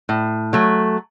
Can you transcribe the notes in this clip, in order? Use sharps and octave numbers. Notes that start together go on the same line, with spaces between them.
A2
F#3 A3